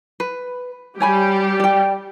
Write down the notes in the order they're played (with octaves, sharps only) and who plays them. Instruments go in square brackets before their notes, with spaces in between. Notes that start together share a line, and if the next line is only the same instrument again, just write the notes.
[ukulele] B4
[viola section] G3 G4 [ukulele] C#5 G#5 B5
[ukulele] D5 G5